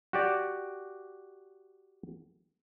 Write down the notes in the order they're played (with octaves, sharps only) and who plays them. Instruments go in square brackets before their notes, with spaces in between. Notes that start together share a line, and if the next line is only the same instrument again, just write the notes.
[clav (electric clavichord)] F#4 G4 D5